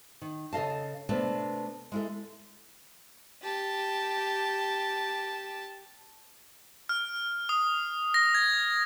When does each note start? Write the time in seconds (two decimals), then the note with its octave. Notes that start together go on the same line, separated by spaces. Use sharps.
0.21 D#3
0.53 C#3 A4 D#5 F5 A5
1.09 C3 A3 B3 D4 B4 A5
1.92 G#3 E4 A4
3.43 G4 A5
6.89 F6
7.49 D#6
8.14 A#6
8.35 G#6